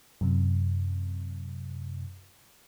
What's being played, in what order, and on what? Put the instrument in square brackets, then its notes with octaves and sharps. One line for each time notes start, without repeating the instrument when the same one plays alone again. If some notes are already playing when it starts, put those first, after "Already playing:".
[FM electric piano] F#2 C3